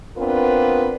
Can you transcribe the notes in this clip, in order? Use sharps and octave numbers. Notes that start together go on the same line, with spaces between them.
B3 C4 D4 F4 A#4 B4